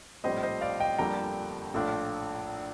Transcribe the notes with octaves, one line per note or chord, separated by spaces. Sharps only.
A#1 A2 G3 C4 C5 D#5
C5 D#5
D5 F5
D#5 G5
G1 F2 D3 G3 A#3 G5 A#5
A#1 A2 A3 D4 F4